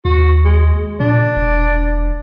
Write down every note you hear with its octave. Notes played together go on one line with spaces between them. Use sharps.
D#2 F#4
G#3
A#2 D4
E1